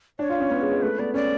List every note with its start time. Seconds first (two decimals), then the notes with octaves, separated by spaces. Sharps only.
0.19 D4 C#5
0.30 F4
0.40 C#4
0.51 B3
0.61 G#3
0.72 G#3
0.82 A3 B4
0.98 B3 D5
1.14 C#4 D5